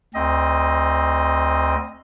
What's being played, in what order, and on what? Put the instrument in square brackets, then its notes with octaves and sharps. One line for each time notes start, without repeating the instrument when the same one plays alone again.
[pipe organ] D2 C4 D#5